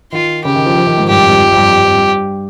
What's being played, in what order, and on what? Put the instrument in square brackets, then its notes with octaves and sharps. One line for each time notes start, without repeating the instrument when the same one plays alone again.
[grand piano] D#3 [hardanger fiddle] F4
[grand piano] C#3 [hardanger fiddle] G4
[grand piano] D#3
F3
F3
D#3
G#2
[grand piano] G2 [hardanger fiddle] G4
[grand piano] F2
G2
F2
F2
G2
G2
F2
G2